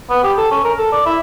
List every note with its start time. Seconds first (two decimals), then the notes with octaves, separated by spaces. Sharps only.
0.10 B3
0.23 G4
0.38 A4
0.51 C#4
0.65 A#4
0.78 A4
0.92 D5
1.06 E4